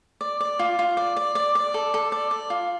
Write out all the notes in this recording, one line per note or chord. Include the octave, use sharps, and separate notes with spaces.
D5
D5
F4
F4
D5
D5
D5
D5
A4
A4
D5
D5
F4